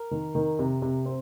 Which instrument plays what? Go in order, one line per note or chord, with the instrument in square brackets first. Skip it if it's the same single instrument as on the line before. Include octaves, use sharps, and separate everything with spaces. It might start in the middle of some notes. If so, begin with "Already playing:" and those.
Already playing: [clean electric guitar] A#4
[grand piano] D#3
D#3
C3
C3
C4